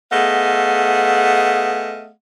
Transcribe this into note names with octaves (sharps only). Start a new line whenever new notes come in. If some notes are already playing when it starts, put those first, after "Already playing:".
A3 B3 G#4 D#5 F5 F#5